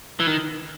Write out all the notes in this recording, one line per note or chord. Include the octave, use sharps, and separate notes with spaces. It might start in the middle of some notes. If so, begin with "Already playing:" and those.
E3
D#3